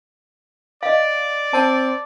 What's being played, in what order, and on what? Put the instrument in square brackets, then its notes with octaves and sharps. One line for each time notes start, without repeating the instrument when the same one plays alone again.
[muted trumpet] D5 [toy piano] D#5 F5
[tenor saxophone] C4 [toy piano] A5